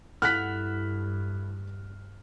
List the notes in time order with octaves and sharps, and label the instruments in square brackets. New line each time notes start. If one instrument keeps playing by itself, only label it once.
[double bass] G2 [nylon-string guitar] E4 A4 F#5 [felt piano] F6 F#6 B6